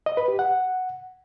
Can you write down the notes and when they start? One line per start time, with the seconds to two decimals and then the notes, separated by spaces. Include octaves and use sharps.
0.06 D#5
0.17 B4
0.28 G4
0.39 F#5